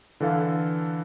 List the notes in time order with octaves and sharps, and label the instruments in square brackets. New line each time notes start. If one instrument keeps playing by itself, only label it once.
[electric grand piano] D3 E3 A4 F5